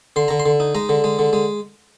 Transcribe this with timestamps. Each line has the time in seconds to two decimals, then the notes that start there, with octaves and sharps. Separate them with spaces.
0.16 D3 C6
0.28 D3 A#5
0.40 C6
0.46 D3
0.60 D#4
0.75 G#3 A#5
0.89 D3
1.04 G#3
1.19 D3
1.33 G#3